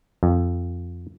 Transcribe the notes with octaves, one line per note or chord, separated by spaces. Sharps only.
F2